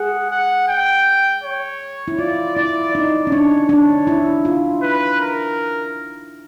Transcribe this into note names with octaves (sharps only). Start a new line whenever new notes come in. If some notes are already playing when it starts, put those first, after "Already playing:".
Already playing: G#4 F#5
F#5
G5
C#5
E4
F4 D5
E4 D5
D#4 D5
C#4
D4 C#5
D4 C#5
E4
F4
B4
A#4